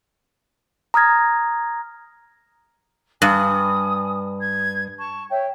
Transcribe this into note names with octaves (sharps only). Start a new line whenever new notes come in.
A#5 D#6 F6 G#6 A#6
G2 G#5 D#6
G#6
A5 C#6
C#5 E5 G5